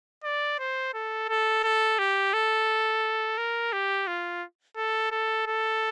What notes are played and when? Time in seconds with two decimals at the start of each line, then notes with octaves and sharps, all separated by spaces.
0.24 D5
0.59 C5
0.94 A4
1.29 A4
1.64 A4
1.99 G4
2.33 A4
3.38 A#4
3.73 G4
4.07 F4
4.77 A4
5.12 A4
5.46 A4